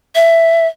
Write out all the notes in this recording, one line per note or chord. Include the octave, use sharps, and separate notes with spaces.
E5